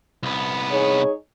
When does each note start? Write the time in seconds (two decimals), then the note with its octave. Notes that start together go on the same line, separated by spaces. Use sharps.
0.23 C2 B3
0.70 D#4 G#4 C#5